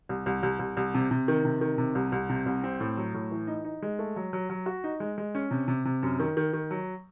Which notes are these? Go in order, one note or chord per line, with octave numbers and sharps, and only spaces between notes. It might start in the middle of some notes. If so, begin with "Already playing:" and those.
C2
C2
C2
C2
C2
C3
C3
D#3
C3
D#3
C3
C2
C2
C3
C2
C4
A2
F#3
A2
E3
D#4
D#4
G#3
A3
F#3
F#3
F#3
F#4
D#4
G#3
G#3
C#4
C3
C3
C3
F#2
D#3
D#3
D#3
F#3